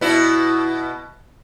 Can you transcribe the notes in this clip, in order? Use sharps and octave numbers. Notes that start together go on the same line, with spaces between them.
B2 E4